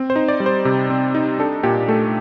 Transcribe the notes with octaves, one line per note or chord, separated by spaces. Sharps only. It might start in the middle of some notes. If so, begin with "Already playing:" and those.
Already playing: C4
C5
D#4
D5
G3
C5
C3
C4
D#4
D4 A4
A#2 G4
A3 A4